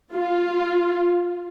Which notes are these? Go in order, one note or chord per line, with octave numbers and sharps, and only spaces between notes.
F4